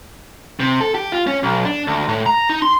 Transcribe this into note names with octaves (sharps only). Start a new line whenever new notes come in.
C3
A4
G4
F4
C#4
B1
D4
D2
A2
A#5
D#4
C6